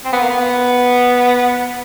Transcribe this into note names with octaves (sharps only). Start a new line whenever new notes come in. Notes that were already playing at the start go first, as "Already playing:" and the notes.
C4
B3
A#3
B3